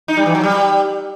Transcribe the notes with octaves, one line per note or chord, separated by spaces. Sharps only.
D#4
G3
E3
F#3
G3